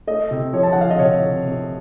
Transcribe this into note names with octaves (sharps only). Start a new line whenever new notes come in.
A3 D#5
C3
F3 C#5
A5
F3 F#5
F5
D#5
C3 C#5
C3
C3